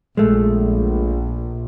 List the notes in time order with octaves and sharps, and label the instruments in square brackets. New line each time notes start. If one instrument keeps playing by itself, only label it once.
[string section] A#1 [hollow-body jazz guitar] G#3 A3